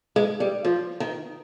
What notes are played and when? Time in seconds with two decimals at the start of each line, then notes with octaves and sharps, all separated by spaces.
0.16 G#3
0.40 G3
0.65 F3
1.00 D#3